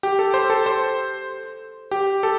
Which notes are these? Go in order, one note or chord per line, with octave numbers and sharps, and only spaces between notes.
G4
A4
C5
A4
C5
G4
A4